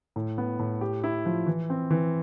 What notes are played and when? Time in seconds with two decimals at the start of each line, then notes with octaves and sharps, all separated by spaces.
0.16 A2
0.38 B3
0.59 A2
0.81 G4
1.04 E4
1.26 F3
1.47 E3
1.70 C4
1.90 E3